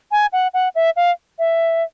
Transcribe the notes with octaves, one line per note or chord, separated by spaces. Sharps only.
G#5
F#5
F#5
E5
F5
E5